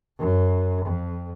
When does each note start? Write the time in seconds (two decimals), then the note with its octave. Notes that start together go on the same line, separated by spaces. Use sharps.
0.19 F#2
0.86 F2